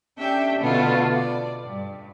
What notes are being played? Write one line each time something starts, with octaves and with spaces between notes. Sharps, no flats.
C#4 D4 G4 A4 E5 G5
B2 D3 A3 B3 F4 F#4
D5
G2